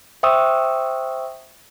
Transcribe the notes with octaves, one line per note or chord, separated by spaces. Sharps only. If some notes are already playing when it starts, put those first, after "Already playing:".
C5 E5 G5 C#6 D#6 E6